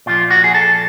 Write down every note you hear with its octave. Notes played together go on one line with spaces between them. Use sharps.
A#2 F3 F4
F#4
G#4
A4